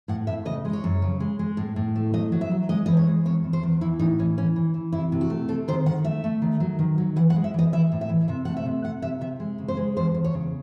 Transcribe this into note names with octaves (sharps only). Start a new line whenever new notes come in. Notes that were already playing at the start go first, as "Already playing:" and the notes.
A2 F#5
A2 E5
C#3 D#5
G#3
C#5
F#2
C#3
G#3
G#3
A2
A2
A3
F#3 D#5
F#3
E5
F#3
G#3 D#5
E3 D#5
C#5
G#3
E2 C#5
E2
C5
E2
E3 E4
A2 D#4
E3 C#4
E3 C#4
E3
E3
C3 E4
C3
F#4
A3
C3 A4
D#3 C5
D#3 F#5
A3 E5
A3
D#3
F#3
D#3
F#3
E3 F#5
F#5
G#3
E5
E3 D#5
E3 E5
A2
E5
E3
C3 E5
A3 F#5
E5
C3
C3 F#5
C3 E5
C3 E5
G#3
C#3
C5
G#3
E2 C5
E2
C#5
C#3